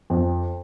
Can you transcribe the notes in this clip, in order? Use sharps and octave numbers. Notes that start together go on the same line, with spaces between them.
F2